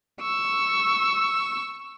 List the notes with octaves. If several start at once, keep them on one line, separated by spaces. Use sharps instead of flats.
C#6 E6